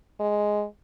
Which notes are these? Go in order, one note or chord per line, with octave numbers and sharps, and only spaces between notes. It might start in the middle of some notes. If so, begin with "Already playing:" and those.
G#3